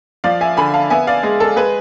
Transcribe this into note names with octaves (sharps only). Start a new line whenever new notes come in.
F3 D5 F5
E5 G#5
D3 G#5 B5
F5 A5
B3 E5 G#5
D5 F5
G#3 G#4
A4
G#3 G#4 B4